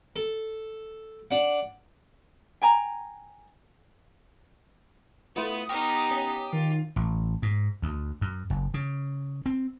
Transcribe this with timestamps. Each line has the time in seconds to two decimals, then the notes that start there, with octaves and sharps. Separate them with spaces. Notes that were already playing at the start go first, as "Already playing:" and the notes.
0.16 A4
1.31 D4 F#5
2.62 G5 G#5 A#5
5.36 A3 B3 E4 F4 D#6
5.69 B3 D#4 G4 C#6 F6 A#6
6.11 C#4
6.53 D#3 F4
6.96 A1
7.42 G#2
7.82 D2
8.21 F#2
8.50 F#1
8.74 C#3
9.46 C4